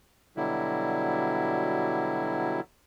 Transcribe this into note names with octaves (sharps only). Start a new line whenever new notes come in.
B2 D3 F#3 G3 E4